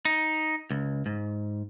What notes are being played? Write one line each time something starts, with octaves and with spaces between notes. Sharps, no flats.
D#4
C#2
G#2